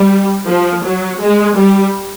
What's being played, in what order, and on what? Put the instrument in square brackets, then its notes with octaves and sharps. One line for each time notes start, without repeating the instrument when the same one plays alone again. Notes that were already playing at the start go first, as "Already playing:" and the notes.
Already playing: [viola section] G3
F3
F#3
G#3
G3